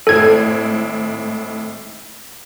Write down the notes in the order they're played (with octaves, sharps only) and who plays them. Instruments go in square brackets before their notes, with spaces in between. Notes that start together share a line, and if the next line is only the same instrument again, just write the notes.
[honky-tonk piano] G#1 A2 [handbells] A4 G#6